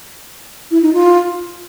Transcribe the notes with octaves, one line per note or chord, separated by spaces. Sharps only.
E4
D#4
F4